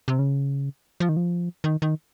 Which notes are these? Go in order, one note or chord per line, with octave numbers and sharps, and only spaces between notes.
C3
C#3
F3
D#3
F3
D#3
D#3